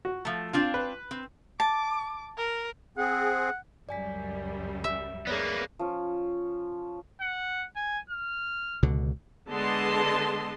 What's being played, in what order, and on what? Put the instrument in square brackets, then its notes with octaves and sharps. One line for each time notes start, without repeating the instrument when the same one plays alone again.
[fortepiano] F#4
[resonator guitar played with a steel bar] F3 A3
[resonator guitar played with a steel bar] C4 D4 F5 [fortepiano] F4
[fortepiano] B4
[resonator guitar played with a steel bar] C4
[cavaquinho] A5 [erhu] D6
[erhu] A#4
[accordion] C4 G#4 [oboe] F#5
[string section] C#2 F#2 G3 [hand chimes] D5 G#5 B6
[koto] E5
[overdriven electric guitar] A#3 B3 [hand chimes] G#4 C#5 D5
[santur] F3 C#4
[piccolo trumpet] F#5
G#5
F6
[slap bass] C#2 B2 D3
[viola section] D3 G#3 B3 D#5 A5 C6